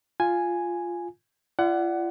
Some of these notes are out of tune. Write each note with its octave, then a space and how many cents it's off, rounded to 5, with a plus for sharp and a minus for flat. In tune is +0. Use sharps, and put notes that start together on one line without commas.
F4 +0 G#5 +0
F4 -40 D5 +0 F#5 +20